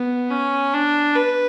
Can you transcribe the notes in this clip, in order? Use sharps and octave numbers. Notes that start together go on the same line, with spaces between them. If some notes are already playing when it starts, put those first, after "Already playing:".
Already playing: B3
C#4
D4
B4